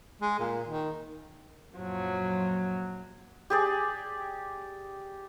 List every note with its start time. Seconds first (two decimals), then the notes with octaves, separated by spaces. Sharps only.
0.22 G#3
0.39 A#2
0.67 D#3
1.75 F#2 A#2 F3 F#3
3.50 G4 G#4 D5